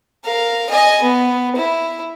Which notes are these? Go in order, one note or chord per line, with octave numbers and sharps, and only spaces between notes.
A#4 F5
D#5 G#5
B3
E4